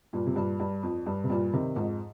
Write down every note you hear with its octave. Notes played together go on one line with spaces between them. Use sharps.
G2 A#2
C3
G2 A#2
G2
F2
G2
C3
G2 A#2
C3 D#3
F2 G#2